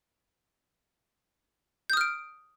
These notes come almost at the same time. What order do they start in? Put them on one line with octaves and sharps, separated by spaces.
G6 D#6 F6 D7